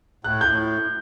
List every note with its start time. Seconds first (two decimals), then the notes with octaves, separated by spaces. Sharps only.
0.24 A2 F#6
0.41 G6
0.46 A2